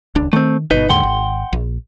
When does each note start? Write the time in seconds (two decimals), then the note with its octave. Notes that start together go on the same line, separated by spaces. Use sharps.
0.15 D#1 C#2 D4
0.33 D#3 A3 C4
0.71 G1 B2 D#4 B4 D#5
0.89 D#2 G#2 D3 F#5 G5 C6
1.03 G#1
1.53 A#1